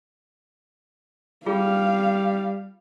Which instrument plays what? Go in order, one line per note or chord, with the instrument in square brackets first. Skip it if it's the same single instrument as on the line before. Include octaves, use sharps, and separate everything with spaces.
[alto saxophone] G3 [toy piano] F4 G#4 [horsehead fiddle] F5